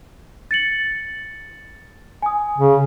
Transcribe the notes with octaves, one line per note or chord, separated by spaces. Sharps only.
A6 C#7 F#7
G#5 D#6
C#3